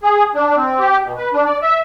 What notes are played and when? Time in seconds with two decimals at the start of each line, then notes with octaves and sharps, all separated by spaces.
0.03 G#4
0.35 D4
0.56 C4
0.79 G4
1.04 B2
1.17 B4
1.33 D4
1.45 D5
1.62 E5